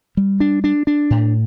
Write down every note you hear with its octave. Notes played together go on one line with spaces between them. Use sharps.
G3
D4
D4
D4
A2